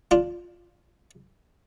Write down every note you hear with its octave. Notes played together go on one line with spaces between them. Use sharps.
D4 F4